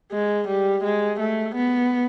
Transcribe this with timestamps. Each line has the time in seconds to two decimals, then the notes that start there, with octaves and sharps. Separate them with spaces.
0.12 G#3
0.48 G3
0.84 G#3
1.20 A3
1.55 B3